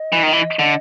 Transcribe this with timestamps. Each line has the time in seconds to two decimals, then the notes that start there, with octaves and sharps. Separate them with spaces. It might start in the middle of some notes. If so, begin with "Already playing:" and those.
Already playing: D#5
0.12 E3
0.23 D#3
0.33 E3
0.59 D3